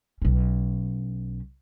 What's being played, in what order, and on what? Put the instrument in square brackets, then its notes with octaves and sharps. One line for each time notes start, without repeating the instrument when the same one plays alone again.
[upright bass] B1 C#4